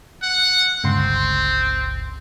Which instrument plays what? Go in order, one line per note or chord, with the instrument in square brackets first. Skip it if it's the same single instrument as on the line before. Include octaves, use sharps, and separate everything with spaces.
[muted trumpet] F#5
[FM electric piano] G1 C#2 C6 [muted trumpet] C4